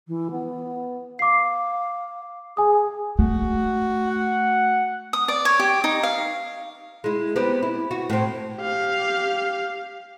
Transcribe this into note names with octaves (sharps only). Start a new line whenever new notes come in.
E3
B3
F5 D6 C7
G#4 G#5 D#6
A3 F#4
F#5
D#6
D5
C#5
G4
D#4
F5
G#3 E4
B3 C4 G4
E4
F#4
A2 C4
G4 F5